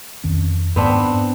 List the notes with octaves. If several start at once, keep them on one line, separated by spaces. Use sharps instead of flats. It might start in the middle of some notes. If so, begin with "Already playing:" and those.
F2 D#3 C#4
G#2 B3 C4 D4